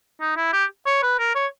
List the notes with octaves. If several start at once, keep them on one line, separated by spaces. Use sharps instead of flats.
D#4
E4
G4
C#5
B4
A#4
C#5